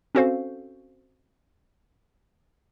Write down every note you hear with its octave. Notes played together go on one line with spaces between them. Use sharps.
C4 C#4 F#4 A4 C5 F5